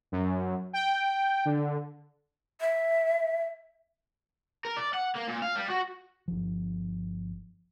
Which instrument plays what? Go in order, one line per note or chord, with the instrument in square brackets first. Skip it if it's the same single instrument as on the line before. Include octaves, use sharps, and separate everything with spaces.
[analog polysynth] F#2
G5
D3
[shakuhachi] E5
[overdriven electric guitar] A#4
D5
F#5
A#3
A#2
F5
G3
F#4
[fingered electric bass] G1 F3